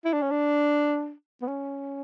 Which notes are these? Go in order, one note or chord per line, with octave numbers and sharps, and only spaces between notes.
E4
D4
C#4
D4
B3
C#4